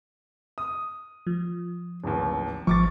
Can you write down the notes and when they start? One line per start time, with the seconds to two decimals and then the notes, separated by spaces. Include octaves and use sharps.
0.58 D#6
1.27 F3
2.04 D1 A1 D#2
2.67 G#1 F3 C#6 D6 A6